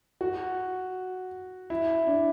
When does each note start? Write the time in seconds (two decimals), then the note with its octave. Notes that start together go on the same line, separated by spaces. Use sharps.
0.21 F#4
1.70 E4
2.07 D4